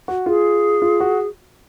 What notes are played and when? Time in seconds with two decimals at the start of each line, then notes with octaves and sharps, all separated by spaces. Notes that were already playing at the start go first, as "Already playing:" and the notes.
0.08 F#4
0.26 F4 G#4
0.82 F4
1.00 F#4